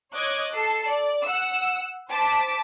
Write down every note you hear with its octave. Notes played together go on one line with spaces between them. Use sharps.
C#5 D#5 D6 F#6 G#6
A4 C7
D5
F#5 E6
C5 A5 D6 B6 D7